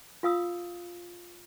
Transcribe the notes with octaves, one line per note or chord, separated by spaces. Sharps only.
F4 F5 D#6 E6